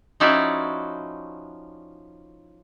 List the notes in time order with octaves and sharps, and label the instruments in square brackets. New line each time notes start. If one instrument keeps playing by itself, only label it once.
[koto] F3 C#4 D#4 E4 F#4 D5